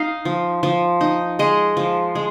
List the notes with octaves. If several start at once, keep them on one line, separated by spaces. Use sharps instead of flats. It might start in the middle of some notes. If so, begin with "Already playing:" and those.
Already playing: D#4 D#5 F5
F3
F3
D#4
G#3 D#5
F3
G#3